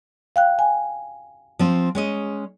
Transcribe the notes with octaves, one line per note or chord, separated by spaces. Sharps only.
F5 G5 F#6
G#5
F3 C4
G#3 C#4 D#5